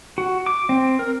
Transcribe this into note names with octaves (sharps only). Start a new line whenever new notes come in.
F#4
D6
C4
A#4